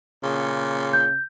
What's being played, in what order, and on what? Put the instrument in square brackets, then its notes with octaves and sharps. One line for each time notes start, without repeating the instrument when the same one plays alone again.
[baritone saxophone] A#2 [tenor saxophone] C#3
[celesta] G6